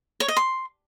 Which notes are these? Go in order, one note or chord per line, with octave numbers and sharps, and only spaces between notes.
C#5
D#5
C6